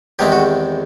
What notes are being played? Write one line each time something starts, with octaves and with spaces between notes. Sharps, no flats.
E2 C3 D#3 G#3 C4 G4
F#4